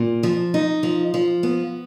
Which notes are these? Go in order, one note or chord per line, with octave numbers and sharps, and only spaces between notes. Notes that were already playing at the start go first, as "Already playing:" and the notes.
Already playing: A#2
F3
D#4
F3
F3
B3